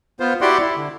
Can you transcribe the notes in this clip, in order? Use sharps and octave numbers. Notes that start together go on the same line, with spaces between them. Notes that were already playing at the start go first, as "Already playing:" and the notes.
B3 F4 C5
E4 F#4 G4 D5 F#5 C6
E4
D3